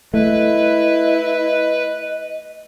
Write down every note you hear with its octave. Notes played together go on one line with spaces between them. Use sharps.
A3 E4 B4 D#5